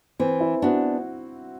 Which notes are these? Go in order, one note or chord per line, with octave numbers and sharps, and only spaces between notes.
E3 C4
E4
B3 D4 F#4